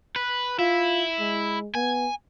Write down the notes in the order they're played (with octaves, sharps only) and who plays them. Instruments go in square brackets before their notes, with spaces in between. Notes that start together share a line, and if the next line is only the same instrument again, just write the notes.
[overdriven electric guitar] B4
[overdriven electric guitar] E4 [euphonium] F4
[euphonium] G#3
[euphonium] B3 [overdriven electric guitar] G#5